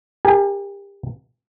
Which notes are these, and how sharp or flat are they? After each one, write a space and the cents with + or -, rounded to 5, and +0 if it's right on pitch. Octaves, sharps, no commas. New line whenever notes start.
G4 +30 A#4 -5 G#5 +15